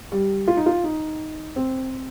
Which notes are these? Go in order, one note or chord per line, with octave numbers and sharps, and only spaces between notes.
G3
F4
D#4
F4
D#4
C4